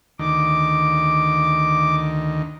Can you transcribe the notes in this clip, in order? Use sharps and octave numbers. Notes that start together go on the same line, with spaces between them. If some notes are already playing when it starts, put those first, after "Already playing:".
D2 D#3 D6